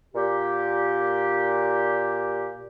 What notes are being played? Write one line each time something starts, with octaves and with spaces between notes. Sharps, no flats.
A#2 G4